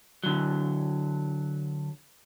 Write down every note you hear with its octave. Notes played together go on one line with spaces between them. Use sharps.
D3 F#3